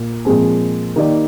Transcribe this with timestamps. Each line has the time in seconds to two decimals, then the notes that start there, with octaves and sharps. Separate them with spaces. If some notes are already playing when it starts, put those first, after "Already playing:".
Already playing: A#2
0.25 A#2 F3 G#3 C4
0.96 D#3 A#3 D#4 G4 D5